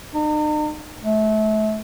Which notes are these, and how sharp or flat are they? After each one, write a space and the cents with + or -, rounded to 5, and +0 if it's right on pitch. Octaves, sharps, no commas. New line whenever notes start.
D#4 -45
A3 -30